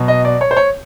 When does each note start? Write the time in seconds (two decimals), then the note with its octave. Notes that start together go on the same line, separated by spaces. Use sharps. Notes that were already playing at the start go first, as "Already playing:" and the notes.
Already playing: B2 F#3
0.08 D#5
0.25 D5
0.41 C#5
0.51 C5
0.57 C#5